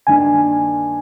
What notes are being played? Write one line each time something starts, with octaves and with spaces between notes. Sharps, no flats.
G2 D#3 A#3 D4 G#5